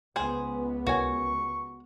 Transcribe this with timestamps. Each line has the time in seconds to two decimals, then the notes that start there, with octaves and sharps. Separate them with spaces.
0.16 C#2 B3 G#4 C5
0.87 C2 F#4 A#4 C#5 G#5 C#6